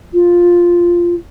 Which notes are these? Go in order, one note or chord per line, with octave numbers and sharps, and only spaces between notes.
F4